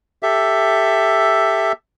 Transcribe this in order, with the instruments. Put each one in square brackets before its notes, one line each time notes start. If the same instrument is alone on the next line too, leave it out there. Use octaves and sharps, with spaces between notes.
[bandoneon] G4 A4 E5